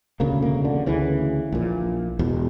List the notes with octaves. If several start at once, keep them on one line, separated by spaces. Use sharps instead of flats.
E1 D2 C#3 A#3
A#3
D3
D2 C#3 E3
A#1 A#2
E1 E2 B2